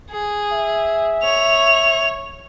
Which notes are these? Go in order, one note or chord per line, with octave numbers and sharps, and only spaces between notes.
G#4
E5
C#5 F7